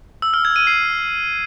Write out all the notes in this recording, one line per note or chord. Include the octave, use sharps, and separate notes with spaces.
E6
F6
G#6
D#7
C7